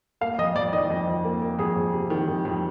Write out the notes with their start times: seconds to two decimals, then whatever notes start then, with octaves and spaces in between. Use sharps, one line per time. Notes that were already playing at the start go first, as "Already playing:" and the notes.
0.21 A#3 F5
0.39 F2 D#5
0.56 F2 D5
0.73 D#3 D#5
0.90 F2
1.08 F2
1.25 A#3
1.42 A#3
1.59 F2 G#4
1.76 F2
1.94 C3
2.10 D#3
2.28 F2
2.45 F2